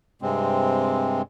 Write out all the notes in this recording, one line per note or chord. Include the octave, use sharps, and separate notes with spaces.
G2 C3 G#3 C4